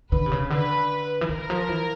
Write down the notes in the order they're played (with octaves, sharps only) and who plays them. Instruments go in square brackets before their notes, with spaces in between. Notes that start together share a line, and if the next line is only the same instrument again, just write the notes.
[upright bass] D3 [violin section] B4
[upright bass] C3
C#3
[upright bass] D3 [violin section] B4
[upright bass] E3
[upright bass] D#3 [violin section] A#4
[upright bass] F3
E3